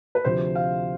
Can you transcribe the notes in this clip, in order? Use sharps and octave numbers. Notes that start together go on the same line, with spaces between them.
B4
D2 C3 F3 C5
F5